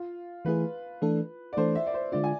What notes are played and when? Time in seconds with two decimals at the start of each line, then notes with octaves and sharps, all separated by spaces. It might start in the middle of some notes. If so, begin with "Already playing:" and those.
Already playing: F4
0.45 E3 A3 E4 G#4 B4
1.02 E3 A3 D4 A4
1.53 D5
1.57 E3 A3 D4 A4 C5
1.75 E5
1.87 D5
1.94 C5
2.12 D3 G#3 D4 F4 D5
2.24 G#5